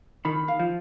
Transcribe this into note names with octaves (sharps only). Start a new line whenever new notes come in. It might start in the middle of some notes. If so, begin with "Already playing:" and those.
D#3 B5
F5
F3